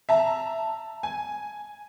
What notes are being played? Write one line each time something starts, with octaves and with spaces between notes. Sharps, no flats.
E5 A5 A#5
G#5